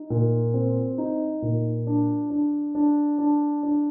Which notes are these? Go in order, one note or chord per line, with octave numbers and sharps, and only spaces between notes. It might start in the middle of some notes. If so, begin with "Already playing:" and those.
Already playing: D#4
A#2
C4
D#4
A#2
D4
D4
D4
D4
D4